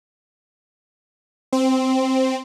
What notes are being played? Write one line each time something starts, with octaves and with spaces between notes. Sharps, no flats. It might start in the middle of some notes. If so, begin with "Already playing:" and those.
C4